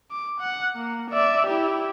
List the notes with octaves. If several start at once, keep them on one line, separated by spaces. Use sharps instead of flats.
D6
F#5
A#3
D5 E5
E4 G4